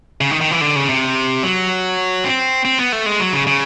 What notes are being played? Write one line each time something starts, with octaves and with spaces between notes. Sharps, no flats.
C#3
D#3
D#3
E3
D3
C#3
C3
F#3
C4
C4
B3
A3
G#3
F#3
C#3
C#3